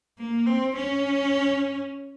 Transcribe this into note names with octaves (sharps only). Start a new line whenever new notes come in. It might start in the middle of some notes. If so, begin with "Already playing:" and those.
A#3
C4
C#4